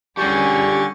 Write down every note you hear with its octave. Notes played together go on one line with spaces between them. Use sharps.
D3 G3 C#4 G4 G#4 G#5 C#6 A6